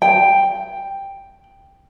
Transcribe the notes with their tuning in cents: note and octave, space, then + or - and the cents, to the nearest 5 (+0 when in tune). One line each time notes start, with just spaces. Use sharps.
G5 +5